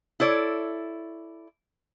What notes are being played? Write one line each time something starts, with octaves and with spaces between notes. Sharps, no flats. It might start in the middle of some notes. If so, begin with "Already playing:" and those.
E4 A4 C#5 D5